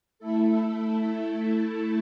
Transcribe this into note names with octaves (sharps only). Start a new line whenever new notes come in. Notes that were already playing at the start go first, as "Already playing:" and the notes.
A3 E4 A4